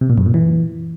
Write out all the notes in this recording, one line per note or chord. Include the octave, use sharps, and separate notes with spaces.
C3
A#2
F#2
A#2
E3